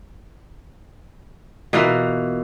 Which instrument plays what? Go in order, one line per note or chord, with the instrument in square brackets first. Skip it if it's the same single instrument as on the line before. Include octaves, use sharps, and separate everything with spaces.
[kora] B2 E3 A#3 F4